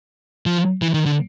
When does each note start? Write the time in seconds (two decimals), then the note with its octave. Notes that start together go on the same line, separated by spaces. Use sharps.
0.46 F3
0.82 E3
0.94 D#3
1.06 D3